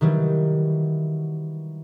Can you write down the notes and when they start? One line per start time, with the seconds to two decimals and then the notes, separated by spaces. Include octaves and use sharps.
0.01 D#3 E3 F#3 G3